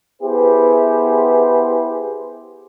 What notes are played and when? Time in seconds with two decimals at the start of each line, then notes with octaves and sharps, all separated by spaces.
0.22 B3 E4 G4 G#4 B4 C5